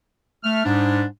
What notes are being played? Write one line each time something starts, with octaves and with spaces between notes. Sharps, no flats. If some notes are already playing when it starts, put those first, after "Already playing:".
A3 F6
G#2 G3 D4